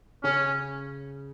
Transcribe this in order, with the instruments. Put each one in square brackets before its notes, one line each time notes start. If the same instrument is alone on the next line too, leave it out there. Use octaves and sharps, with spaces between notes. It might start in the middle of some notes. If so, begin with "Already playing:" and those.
[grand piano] C#3 [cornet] C#4